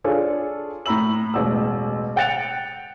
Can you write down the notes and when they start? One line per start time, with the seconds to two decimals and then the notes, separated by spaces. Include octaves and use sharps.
0.04 D4 F4 G#4 A4 C#5 D5
0.86 A2 A#5 B5 E6 F#7
1.34 E1 A1 E6
2.16 F#5 G5 F#6 A6 C#7 F7